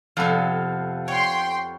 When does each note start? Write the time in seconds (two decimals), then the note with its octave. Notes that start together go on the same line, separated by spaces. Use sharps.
0.17 F2 C3 B3 A4 F5
1.08 C#5 G5 C6